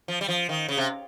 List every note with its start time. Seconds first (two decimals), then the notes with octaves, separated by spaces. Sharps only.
0.08 F3
0.21 G3
0.28 F3
0.49 D#3
0.68 C#3
0.78 C3